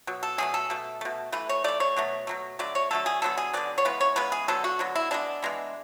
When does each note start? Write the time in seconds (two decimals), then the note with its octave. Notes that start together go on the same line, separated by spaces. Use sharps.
0.07 B2 F#3
0.23 A4
0.38 B2 F#3 A3 G#4
0.54 A4
0.70 B2 A3
1.01 B2 A3
1.32 E3 A3 B4
1.49 C#5
1.64 E3 A3 D5
1.80 C#5
1.96 B2 F#3 A3
2.27 B2 F#3 A3
2.59 D3 F#3 A3 D5
2.75 C#5
2.91 D3 F#3 A3 A4
3.06 G#4
3.22 D3 F#3 B3 A4
3.37 G#4
3.53 D3 F#3 B3 D5
3.78 C#5
3.85 C#3 E3 G#3 B3 B4
4.01 C#5
4.16 C#3 E3 G#3 B3 B4
4.32 G#4
4.48 D3 F#3 B3 A4
4.64 F#4
4.79 D3 F#3 B3
4.96 E4
5.11 E3 G#3 B3 D4
5.42 E3 G#3 B3